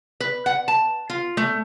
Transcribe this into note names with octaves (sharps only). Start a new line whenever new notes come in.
B4
F#5
A5
F4
A3